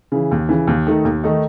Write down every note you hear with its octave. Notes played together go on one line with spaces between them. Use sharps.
C#3 E3
D#2
C#3 E3
D#2
D#3 A3 D#4
D#2
D#3 A3 D#4